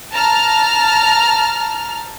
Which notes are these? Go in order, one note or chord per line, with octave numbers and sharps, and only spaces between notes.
A5 A#5 F6